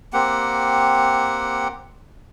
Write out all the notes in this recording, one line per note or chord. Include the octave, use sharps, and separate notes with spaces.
A#3 C4 G4 F#5